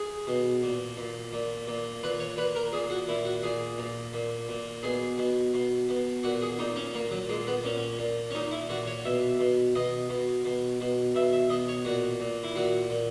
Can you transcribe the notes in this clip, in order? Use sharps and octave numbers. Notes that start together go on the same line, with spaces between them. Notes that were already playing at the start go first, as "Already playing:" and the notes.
Already playing: G#4
B2
A#2
A#2
A#2
A#2
A#2 B4
C#5
A#2 B4
A#4
A#2 G#4
F#4
A#2 E4
F#4
A#2 G#4
A#2
A#2
A#2
B2 G#4
B2
B2
B2
A#2 F#4
G#4
A#2 D#4
C#4
A#2 A#3
F#3
A#2 G#3
B3
A#2 C#4
A#2
C#4
A#2 D#4
E4
A#2 F#4
C#5
B2 E5
B2
B2 D#5
B2
B2
B2
B2 E5
E5
B2 D#5
C#5
A#2 F#4
A#2
E4
A#2 F#4
A#2